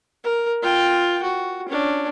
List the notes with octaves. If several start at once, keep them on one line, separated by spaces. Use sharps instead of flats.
A#4
F4 G5
F#4
C#4 D4